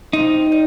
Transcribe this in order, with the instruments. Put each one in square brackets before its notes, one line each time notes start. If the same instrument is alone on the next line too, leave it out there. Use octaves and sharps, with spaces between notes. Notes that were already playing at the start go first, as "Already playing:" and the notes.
[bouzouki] C3 F3 C4 [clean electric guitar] D#4
[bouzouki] G3